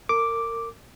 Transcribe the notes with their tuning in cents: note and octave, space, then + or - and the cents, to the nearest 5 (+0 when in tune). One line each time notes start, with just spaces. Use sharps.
A#4 -30 D6 +0